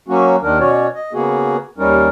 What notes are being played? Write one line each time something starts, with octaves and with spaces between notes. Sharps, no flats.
F#3 A#3 C#4 F#4
D#2 D#3 D4 A#4
B2 C#4 F#4 C#5 D5
D#5
C#3 A#3 B3 F#4 G#4
D#2 G3 C#4 D#4 A#4